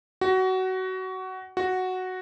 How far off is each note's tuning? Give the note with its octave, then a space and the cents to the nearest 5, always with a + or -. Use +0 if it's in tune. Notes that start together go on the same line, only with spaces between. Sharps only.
F#4 +20
F#4 +0